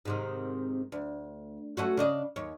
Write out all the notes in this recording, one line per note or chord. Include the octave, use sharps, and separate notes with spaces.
G#2 C3 D#3
D2
A3 C#4 F#4
C#3 D4 D#5
D#2 C#5